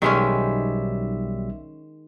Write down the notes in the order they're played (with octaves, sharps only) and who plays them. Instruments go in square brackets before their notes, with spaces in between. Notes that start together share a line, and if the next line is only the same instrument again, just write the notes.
[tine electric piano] B1 G3 E5 [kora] D#3 G#3 C#4